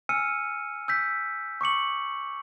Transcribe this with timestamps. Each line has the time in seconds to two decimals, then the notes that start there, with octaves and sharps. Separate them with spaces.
0.09 G#5 E6 F6 C#7 D#7
0.88 E6 G6 B6
1.61 C#6 D6 C#7 F#7